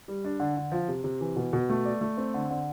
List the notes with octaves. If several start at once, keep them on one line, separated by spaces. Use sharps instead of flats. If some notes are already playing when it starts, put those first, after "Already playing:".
G3
D4
D3
D3
F3
C3
C3
E3
B2
B2
A3
D5
A3
C4
D3
D3